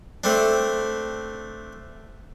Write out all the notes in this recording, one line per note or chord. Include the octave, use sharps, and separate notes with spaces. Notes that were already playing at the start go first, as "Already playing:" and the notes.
A3 C4 D4